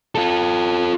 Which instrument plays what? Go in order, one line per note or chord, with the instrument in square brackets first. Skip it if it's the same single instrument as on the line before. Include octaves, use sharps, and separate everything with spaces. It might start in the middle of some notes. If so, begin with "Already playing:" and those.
[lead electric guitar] F4 A4